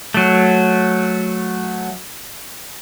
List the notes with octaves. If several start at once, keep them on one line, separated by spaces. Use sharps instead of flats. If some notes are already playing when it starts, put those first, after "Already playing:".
F#3 A3